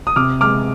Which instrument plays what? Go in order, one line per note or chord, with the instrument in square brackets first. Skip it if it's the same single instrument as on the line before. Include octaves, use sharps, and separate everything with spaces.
[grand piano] D#6
C3 D6 F6
G#3 D6 F6